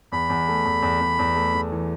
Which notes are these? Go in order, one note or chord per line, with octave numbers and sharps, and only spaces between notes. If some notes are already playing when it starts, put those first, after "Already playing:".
E2 B5
E2
A3
E2
E2
E2
E2
A3
E2
E3